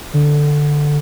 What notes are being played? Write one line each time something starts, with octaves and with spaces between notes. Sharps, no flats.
D3